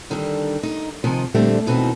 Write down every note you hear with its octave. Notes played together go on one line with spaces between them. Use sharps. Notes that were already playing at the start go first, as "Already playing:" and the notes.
D3 D#3 G3 D4 G4 A4
D#4
C3 D#3 F3 G#4 D#5
A#2 D3 G3 A3 C4 D4
D#2 B2 E3 C4 D#4